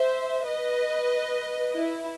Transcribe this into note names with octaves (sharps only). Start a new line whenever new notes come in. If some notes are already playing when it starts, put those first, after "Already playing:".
Already playing: C5 E5
B4 D#5
E4